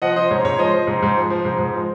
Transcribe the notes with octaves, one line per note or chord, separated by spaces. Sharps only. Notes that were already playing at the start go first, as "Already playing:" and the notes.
F3 D#5 F#5
F3 C5 D#5
G#2 C#5
G#2 C#5
F3 C5 D#5
F3
G#2
G#2
F3
F3
G#2
G#2
F3